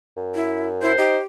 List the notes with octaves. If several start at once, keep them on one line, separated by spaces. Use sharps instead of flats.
F#2
E4
E4 C5
D#4 G4